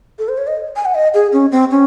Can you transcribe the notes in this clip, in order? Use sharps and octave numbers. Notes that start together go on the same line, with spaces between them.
A4
C5
C#5
D#5
G#5
F#5
D#5
G#4
C#4
C4
C#4